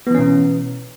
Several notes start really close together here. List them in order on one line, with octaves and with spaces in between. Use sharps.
B3 E3 C#4 B2